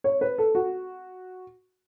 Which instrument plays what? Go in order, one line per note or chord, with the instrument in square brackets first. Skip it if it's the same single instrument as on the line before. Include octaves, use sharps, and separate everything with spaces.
[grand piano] C#5
B4
A4
F#4